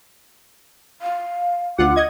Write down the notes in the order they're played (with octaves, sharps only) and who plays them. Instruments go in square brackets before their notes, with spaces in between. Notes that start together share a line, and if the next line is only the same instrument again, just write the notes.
[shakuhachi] F5
[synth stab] D2 F4 F#5 [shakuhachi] D6
[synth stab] D#5 G#6